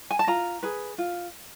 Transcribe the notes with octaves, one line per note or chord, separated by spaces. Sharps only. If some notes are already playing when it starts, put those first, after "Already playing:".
G#5
A5
F4 A#5
G#4 B4
F4